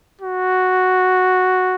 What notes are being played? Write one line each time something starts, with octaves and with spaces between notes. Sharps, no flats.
F#4